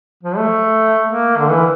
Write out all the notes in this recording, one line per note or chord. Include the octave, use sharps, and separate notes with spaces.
F3
A3
A#3
D3
E3